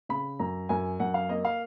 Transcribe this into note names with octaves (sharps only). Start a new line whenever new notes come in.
C#3 B5
F#2 A#5
F#2 G#5
F#2 F#5
F5
A#3 D#5
F5